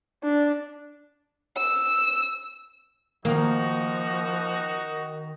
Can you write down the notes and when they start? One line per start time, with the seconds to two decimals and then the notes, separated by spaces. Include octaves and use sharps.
0.24 D4
1.57 E6
3.25 D#3 F3 A#3 D#4 F#4